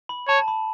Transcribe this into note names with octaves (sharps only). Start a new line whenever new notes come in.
B5
C#5 A5
A5
B5